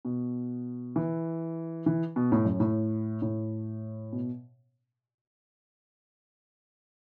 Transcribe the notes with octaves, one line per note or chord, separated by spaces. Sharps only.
B2
E3
E3
B2
A2
F#2
A2
A2
B2